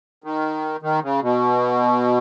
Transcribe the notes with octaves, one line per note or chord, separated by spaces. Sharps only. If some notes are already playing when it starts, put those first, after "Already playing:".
D#3
D#3
C#3
B2